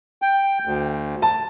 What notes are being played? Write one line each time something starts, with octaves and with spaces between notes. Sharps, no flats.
G5
D2
A5